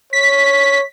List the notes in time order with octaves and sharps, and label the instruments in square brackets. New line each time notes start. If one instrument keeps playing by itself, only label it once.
[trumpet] C#5 [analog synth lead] B6